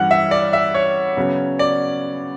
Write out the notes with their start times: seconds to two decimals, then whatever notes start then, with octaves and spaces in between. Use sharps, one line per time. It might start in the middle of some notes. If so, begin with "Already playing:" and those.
Already playing: G2 E3 G3 C#4 F#5
0.11 E5
0.31 D5
0.53 E5
0.74 C#5
1.17 C#3 F#3 B3
1.59 D5